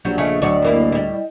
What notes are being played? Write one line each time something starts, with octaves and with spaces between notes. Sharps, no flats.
A#1 F#3 G3
C#3 A3 C#4 G#4 D#5
D2 A2 F#3 C#5 D5
F#2 A#3 E4
G3 E4